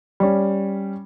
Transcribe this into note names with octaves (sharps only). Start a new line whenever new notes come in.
G3 C#4